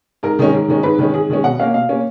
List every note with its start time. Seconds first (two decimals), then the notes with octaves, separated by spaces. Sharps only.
0.23 G#2 A#4
0.39 D#3 G#3 C#4
0.54 G#2
0.68 D#3 G#3 C#4
0.83 G#2 B4
0.99 D#3 G#3 C#4
1.14 G#2 G#4
1.29 D#3 G#3 C#4
1.43 B2 F#5
1.60 A#3 C#4 F5
1.74 B2 F5
1.89 A#3 C#4